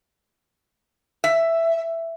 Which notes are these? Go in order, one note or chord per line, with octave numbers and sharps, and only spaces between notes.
E5